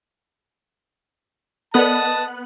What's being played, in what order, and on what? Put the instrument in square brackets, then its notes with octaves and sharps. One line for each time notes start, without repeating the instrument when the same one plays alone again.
[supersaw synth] B3 F#6 [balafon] A4 A#4 D5 [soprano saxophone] D#5 [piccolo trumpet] A5